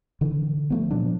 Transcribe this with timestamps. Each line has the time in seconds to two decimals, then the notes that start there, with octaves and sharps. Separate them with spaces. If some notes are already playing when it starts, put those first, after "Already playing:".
0.21 D3 E3
0.70 F3 A3 B3
0.91 A#2 F3 F#3 D4